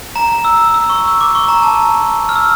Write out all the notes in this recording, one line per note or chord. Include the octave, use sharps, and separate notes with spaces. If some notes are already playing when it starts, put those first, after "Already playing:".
A#5
E6
E6
C#6
E6
D6
C#6
A#5
A5
F6
E6